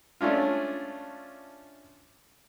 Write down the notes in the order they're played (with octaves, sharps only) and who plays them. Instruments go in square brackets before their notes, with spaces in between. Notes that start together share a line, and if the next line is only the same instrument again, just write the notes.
[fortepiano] A3 C#4 D4 F4